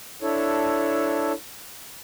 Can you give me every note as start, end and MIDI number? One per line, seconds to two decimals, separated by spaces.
0.22 1.32 62
0.22 1.32 64
0.22 1.32 69
0.22 1.32 73